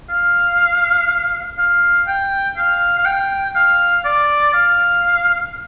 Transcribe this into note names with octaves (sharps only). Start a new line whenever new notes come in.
F5
F5
G5
F5
F5
G5
F5
D5
F5